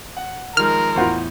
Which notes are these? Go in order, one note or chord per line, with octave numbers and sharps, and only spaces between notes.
F#5
D#3 F3 G#3 A#4 F6
E2 A2 F4 F#4 C5